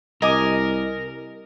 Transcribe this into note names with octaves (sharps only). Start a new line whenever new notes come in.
C2 A#4 D#5 G#5 D6